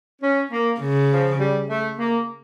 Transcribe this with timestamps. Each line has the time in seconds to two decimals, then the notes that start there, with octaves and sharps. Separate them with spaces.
0.22 C#4
0.52 A#3
0.81 C#3
1.10 F3
1.39 G3
1.69 A3
1.98 A#3